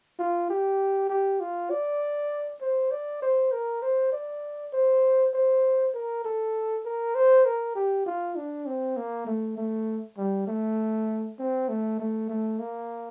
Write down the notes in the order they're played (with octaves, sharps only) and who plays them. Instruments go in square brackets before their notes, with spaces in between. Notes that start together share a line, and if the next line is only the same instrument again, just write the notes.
[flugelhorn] F4
G4
G4
F4
D5
C5
D5
C5
A#4
C5
D5
C5
C5
A#4
A4
A#4
C5
A#4
G4
F4
D4
C4
A#3
A3
A3
G3
A3
C4
A3
A3
A3
A#3